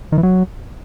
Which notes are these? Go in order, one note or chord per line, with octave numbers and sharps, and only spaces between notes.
D#3
E3
F#3